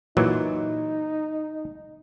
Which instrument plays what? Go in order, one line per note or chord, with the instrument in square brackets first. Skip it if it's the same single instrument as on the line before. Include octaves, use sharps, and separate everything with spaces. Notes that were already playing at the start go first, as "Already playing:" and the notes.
[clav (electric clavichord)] A#2 E3 F#3 [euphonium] D#4